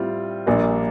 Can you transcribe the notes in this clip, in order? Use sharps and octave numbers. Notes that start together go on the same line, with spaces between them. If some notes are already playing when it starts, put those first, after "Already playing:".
Already playing: A2 G3 C4 F4
A#1 A#2 G3 A#3 D4